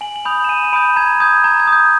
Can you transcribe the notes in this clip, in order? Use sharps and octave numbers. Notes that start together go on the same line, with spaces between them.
G#5 F#7
F#7
B5 D#6 G6 F7
E7
G#5 D#7
D#7
B5 D#6 G6 D7
A#5 G#6
D#6 G6 G#6
A#5 G#6
G#6
D#6
G6